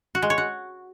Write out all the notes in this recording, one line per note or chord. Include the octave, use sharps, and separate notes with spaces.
F#4
G#3
C#5
F#4